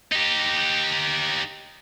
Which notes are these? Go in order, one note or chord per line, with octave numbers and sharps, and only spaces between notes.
D#4 G4